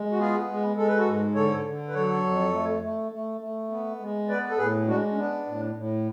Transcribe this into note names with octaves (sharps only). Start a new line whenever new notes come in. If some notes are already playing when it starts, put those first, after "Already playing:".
Already playing: G#3
F#4
B3 F4 G#4
G#3
G#3 A4
B4
F#4 A4
G#2
D3 A4 C#5
D3
B4
F#3 A4 C#5
F2
A3
A3
A3
A3
B3
G#3
B3 B4 D5
A4
A2 G#4 B4
G#3 D4 F#4
C#4
B3 D4
A2
A2